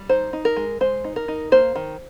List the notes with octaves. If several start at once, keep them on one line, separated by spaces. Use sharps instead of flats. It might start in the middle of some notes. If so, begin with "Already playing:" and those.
Already playing: G3
D#4 C5
D#4
A#4
G#3
G#3 C5
D#4
A#4
D#4
A#3 C5
D#3